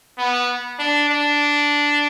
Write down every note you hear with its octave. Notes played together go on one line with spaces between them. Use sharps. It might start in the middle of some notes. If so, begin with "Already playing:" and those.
B3
D4
D4